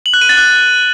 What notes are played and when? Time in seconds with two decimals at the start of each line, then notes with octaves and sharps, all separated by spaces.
0.06 F#7
0.14 F#6
0.21 D#7
0.29 A6
0.37 F#6